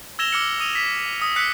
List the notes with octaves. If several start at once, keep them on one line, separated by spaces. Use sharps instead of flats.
E6 G#6 A#6 E7 F7 G7
D6 E6 F6 G#6 C#7 F#7
D#6 D#7 F7
B6
D#6
E6 F#6 B6 C#7